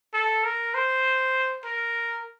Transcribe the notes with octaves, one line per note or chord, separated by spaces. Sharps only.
A4
A#4
C5
A#4